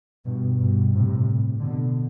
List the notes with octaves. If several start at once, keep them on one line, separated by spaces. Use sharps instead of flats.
G2 B2
G2 B2
A2 C3
B2 D3